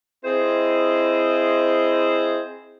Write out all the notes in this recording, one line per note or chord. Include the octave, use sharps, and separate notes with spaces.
C4 E4 G#4 C5 D#5